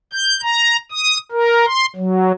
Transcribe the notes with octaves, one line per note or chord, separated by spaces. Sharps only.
G6
A#5
D#6
A#4
C6
F#3